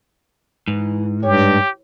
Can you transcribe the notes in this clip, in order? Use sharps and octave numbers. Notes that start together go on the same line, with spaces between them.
G#2 E3
G2 G4 C#5